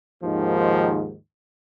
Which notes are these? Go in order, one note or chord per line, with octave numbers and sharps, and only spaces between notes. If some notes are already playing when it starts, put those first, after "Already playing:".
D#2 G#2 D#3 F3